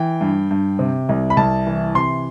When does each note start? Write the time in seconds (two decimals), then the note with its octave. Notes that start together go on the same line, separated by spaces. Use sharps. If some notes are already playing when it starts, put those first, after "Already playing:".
Already playing: E3 G5
0.21 G2
0.51 G2
0.79 C3
1.09 C2
1.30 B5
1.37 C2 A5
1.67 E3
1.95 C3 C6